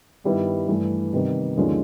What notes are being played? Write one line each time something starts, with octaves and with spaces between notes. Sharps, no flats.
G2 D#3 G3 B3 E4
G2 E3 A3
C3 D#3 G3 B3
D#2 D3 F3 G#3 C#4